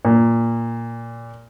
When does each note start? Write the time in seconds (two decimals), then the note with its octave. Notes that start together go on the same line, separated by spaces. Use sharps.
0.05 A#2